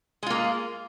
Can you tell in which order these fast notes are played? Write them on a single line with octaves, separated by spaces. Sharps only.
G#3 F4 A#3